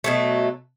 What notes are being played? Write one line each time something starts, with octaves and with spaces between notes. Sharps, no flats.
B2 F#3 A3